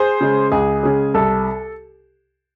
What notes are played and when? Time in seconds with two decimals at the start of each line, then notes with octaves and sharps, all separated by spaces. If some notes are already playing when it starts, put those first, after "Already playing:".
Already playing: G#4 C5
0.21 C#3 G#3
0.52 C#2 G#4
0.83 C#3 G#3
1.14 C2 A4